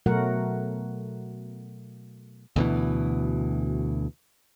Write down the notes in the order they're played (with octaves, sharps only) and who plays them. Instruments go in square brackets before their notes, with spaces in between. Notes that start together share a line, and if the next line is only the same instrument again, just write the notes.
[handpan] B2 F#3 A3 F#4 A#4 F#5
[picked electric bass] D2 B2 E3